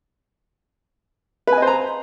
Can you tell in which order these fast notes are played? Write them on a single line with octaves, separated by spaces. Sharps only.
B4 G#5 D#5 C5 A#5